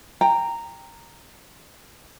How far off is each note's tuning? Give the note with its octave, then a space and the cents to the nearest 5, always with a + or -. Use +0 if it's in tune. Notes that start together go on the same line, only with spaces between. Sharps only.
G5 +10 A#5 -10